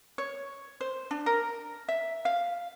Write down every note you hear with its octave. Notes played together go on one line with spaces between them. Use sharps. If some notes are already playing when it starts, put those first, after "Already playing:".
C#5
C5
D4
A#4
E5
F5